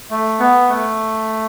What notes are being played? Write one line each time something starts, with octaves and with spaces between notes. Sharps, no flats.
A3
B3
A3